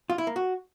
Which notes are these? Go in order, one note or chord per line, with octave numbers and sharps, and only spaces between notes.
F4
E4
A#3
F#4